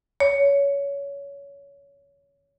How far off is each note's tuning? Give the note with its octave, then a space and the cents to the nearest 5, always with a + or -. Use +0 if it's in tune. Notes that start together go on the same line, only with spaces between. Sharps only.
C#5 +20